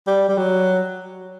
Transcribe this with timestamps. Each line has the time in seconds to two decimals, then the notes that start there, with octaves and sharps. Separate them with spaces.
0.07 G3
0.29 G3
0.37 F#3